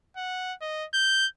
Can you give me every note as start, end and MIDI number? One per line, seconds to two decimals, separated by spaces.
0.17 0.54 78
0.62 0.85 75
0.94 1.27 91